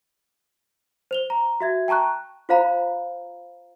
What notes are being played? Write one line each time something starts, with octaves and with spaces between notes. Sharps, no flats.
C5 F7 G7
A#5
F#4 E5 G#6
G5 A5 A#5 C#6 F#6
F4 C5 F5 A#5 B5